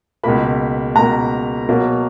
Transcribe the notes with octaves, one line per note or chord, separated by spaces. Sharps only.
C#2 B2 A#3 B5
C#2 B2 A#3 A#5
B2 F#3 A#3